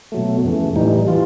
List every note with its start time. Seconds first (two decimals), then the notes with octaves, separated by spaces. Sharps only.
0.12 B2 F#3 A3
0.44 F2 C#3 E3 A3
0.76 A2 E3 G3 D#4
1.07 E3 G3 F4